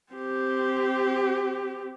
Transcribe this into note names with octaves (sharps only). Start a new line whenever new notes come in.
C4 G4